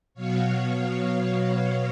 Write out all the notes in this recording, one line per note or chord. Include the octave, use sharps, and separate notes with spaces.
B2 F#3 B3 C#5 F5